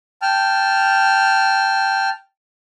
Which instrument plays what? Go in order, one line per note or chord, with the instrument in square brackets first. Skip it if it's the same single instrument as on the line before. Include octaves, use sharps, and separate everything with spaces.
[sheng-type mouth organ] G5 A5 F6